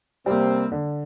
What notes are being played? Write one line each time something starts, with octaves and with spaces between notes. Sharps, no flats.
C3 G3 A#3 C4
D3